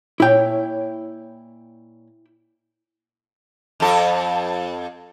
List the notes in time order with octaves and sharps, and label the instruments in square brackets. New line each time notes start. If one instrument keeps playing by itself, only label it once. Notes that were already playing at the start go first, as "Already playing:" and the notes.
[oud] A#2 C#5 [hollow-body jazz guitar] E4 G5
[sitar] F2 A4